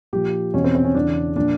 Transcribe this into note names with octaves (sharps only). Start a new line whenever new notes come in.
A#2 F3 G4
E2 B2 C#4
C4
C4
C#4
E2 C#3 E3 D4
A#2 F3 D4